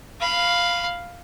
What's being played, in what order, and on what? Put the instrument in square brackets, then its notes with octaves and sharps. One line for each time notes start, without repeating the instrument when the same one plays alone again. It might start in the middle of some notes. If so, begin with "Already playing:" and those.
[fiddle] F5 B5